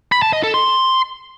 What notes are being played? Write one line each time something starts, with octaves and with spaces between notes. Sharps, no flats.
B5
A5
D#5
A4
C6